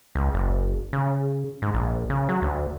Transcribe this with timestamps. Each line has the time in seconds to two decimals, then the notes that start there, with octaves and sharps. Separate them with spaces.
0.15 C#2
0.34 F#1
0.93 C#3
1.62 G#2
1.74 A#1
2.10 C#3
2.29 F#3
2.42 D2